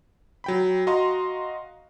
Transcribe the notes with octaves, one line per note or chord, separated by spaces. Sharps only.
F#3 G5 B5
F#4 D#5 F5 A#5 C6